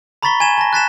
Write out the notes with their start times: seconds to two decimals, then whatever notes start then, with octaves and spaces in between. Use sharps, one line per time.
0.23 A#5 B5 C#6 A6 B6 G7
0.40 G#5 G#6 E7 G7
0.57 A5 A#6
0.73 F#6 A6 B6 E7